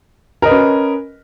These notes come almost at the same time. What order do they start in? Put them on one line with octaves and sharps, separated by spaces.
A#4 D#5 B4 C#4